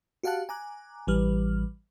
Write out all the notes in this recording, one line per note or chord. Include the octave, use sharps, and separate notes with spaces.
F#4 G4 F5 F#5 A5 F#6
G#5 A#5 D6 F#6
A1 E3 G3 B4 F6